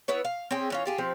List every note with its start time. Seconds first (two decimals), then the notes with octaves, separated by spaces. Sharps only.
0.08 B3 E4 B4 C#5
0.25 F5
0.51 C4 C#4 G#4 G5
0.70 E3 C#4 F4
0.86 F4 G4 G#4
0.98 F3 C4 G4